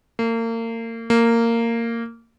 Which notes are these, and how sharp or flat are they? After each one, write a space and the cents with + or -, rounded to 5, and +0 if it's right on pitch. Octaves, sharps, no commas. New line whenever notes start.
A#3 -35
A#3 -15